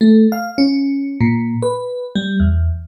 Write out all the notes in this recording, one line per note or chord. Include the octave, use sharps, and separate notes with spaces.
A3
F5
C#4
A#2
B4
G3
E2